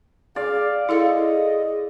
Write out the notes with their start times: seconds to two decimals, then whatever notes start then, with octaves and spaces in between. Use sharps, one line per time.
0.36 G#4 D5 F5
0.89 E4 G#4 A4 D#5 F5